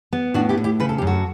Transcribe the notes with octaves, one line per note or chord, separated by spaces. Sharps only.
B3
A2 D4 F#4
E4 G4
A2
E4 G4
C#3 B4
A4
G4
F#2
F#4 A4